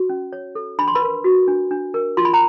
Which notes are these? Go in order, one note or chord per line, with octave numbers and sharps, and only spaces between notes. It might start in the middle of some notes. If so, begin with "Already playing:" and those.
Already playing: F#4
C#4
C#5
A4
D4 B5
C6
B4 B5
A#4
F#4
D4
D4
A#4
F4 C6
B5
A#5